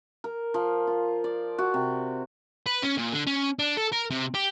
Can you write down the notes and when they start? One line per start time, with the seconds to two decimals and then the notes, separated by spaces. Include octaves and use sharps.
0.24 A#4
0.54 F3
0.87 F4
1.24 D5
1.58 F#4
1.74 C3
2.66 B4
2.83 C#4
2.98 A#2
3.13 D3
3.27 C#4
3.59 D4
3.77 A4
3.92 A#4
4.10 C3
4.34 G4